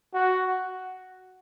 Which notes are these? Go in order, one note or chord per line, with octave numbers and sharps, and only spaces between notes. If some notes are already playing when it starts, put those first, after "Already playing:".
F#4